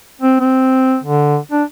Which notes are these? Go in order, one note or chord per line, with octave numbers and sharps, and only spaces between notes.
C4
C4
D3
D4